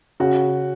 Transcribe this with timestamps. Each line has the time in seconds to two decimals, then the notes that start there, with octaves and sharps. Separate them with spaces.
0.20 C#3 F#4